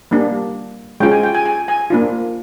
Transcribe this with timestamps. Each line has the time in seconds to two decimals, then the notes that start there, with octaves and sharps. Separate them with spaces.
0.11 G3 A#3 D4
1.00 G#3 C#4 F4 G5
1.12 G#5
1.23 G5
1.35 G#5
1.46 G#5
1.68 G#5
1.90 A#3 D4 F4